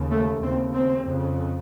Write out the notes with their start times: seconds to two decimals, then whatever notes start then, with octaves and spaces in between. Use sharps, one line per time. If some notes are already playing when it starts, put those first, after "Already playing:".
Already playing: D#2 C#3
0.11 A3
0.42 D#2 C#3 C4
0.74 C4
1.06 F2 C#3